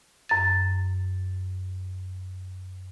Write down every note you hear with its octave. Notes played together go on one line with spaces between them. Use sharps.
F#2 A6